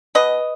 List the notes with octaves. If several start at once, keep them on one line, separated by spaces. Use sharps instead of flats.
B2 B4 D#5